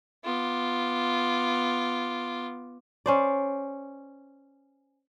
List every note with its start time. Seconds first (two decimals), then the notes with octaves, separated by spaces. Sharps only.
0.25 B3 F4 D6
3.06 C#4 C5 D5